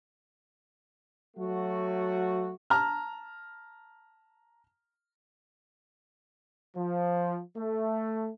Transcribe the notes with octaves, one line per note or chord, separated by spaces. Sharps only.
F#3 A3 F#4
A5 A#5 F6
F3
A3